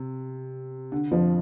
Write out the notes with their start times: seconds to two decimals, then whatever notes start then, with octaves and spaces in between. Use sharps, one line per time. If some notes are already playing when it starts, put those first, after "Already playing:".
Already playing: C3
0.92 D3
1.11 F2 F3